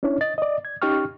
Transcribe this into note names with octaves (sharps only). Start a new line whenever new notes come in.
C#4 D4 E4 C#5
D#5 A6
D5 D#5
G#6
C#4 D#4 G4 G5 C#6 F6